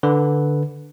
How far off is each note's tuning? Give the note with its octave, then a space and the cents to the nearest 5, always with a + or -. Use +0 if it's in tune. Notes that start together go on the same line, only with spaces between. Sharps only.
D3 +0 B4 +0